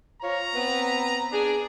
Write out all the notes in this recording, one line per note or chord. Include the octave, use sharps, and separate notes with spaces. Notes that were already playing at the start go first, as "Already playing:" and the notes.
F4 C5 C#5 A#5
B3 C4 B4
D4 G#4